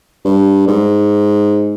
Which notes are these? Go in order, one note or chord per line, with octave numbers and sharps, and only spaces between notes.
G2
G#2